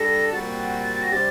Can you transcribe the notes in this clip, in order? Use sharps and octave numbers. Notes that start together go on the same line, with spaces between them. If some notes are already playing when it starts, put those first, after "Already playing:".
Already playing: G3 D4 A4 A#6
A#2 G3 C4 F#4 A6
A#6
C3 G3 D4 G4 C5 A6